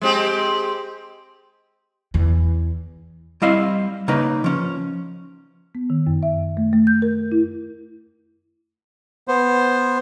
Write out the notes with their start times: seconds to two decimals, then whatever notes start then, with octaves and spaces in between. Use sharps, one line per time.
0.02 G#3 C4 G4
2.14 E2 E3
3.42 G3 C4 E4 D#5 F5
4.08 C#3 A#3 D#4 B4
4.44 F3 C#4
5.75 B3
5.90 D#3
6.07 F#2
6.23 E5
6.57 A3
6.73 A3
6.87 G6
7.02 A#4
7.32 E4
9.28 B3 C5